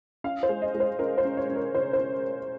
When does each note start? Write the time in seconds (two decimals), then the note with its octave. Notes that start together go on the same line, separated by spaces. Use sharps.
0.24 C#4 F5
0.43 C5
0.49 G#3
0.62 D#5
0.75 G#3
0.80 C5
0.99 C#4 A#4
1.18 C5
1.25 C#4
1.37 C#5
1.49 C#4
1.56 A#4
1.75 C#3 C5
1.93 C5
1.99 C#4